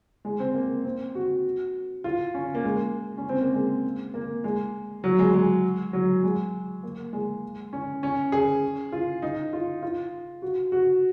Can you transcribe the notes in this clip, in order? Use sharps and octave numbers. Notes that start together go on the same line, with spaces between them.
G#3
C4
A#3
C4
F#4
F4
C#4
A#3
G#3
C#4
C4
A#3
G#3
A#3
G#3
F#3
G#3
G#3
F#3
G#3
A#3
G#3
C#4
C#4
G#4
F4
D#4
F4
F4
F#4
F#4